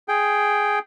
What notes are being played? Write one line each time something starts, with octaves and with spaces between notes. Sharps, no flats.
G#4 G5